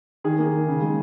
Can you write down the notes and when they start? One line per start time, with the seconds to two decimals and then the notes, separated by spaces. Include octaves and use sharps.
0.24 D#3 G#4
0.39 A#3
0.53 D#3
0.68 C#3
0.82 G#3